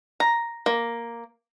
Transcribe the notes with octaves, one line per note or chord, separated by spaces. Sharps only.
A#5
A#3